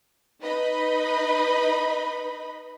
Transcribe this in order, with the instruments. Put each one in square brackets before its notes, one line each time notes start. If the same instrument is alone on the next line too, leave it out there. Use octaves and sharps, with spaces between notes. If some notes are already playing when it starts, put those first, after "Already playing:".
[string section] D#4 B4 D#5 B5